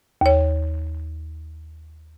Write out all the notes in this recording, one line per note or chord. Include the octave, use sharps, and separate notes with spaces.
D#2 C#5